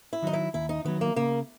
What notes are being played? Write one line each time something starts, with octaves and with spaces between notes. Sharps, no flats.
E4
D#3 F#3 D#4
E4
D#2 E4
D#4
D#3 F#3 B3
A#3
C#3 A#3